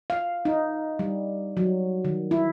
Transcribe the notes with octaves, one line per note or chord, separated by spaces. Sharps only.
F5
D#4
G3
F#3
D#3
E4